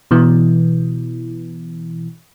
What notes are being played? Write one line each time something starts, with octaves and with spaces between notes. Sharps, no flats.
B2 E3